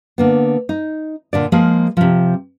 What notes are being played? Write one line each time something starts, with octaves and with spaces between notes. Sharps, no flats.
D3 A#3 B3
D#4
A#2 D3 D5
F3 G#3 A#3 G#4
C3 F3